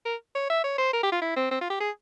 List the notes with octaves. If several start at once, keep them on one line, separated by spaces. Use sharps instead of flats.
A#4
C#5
E5
C#5
C5
A#4
G4
F4
E4
C4
C4
F4
G4
G#4